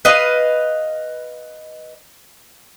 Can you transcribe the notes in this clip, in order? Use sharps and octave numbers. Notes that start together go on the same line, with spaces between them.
B4 D#5 F5